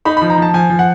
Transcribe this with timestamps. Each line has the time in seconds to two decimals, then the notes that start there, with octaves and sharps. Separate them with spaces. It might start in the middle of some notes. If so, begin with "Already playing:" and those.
0.05 D#4 B5
0.17 F3 B5
0.30 A#5
0.38 F3 A5
0.54 F3 G#5
0.70 F3
0.79 F#5